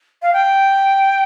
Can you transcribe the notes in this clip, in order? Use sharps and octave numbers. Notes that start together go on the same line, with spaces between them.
F5
G5